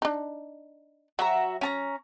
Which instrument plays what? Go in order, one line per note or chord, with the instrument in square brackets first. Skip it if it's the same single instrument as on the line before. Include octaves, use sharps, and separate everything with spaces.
[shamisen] D4 D#4
[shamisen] F#3 [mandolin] F#4 E5 A#5
[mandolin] C#4 A5 A#5